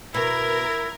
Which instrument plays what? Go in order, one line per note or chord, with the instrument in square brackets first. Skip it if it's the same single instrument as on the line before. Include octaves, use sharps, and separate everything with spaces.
[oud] B2 [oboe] E4 [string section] A#4